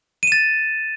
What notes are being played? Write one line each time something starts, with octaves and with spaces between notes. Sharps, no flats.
A6 D#7 E7